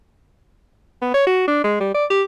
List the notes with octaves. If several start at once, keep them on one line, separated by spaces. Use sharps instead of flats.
B3
C#5
F#4
D4
G#3
G3
D5
G4